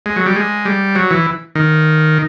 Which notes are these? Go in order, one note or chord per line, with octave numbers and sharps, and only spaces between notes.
G#3
F#3
G3
G#3
G3
F#3
E3
D#3